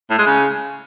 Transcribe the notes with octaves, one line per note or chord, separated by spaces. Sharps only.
A2
G#3
C#3